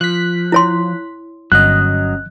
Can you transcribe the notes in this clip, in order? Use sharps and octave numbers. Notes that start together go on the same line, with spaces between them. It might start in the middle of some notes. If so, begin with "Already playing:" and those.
F3 F#6 B6
E4 C#5 C6
G1 F#3 C#4 D#5 F#6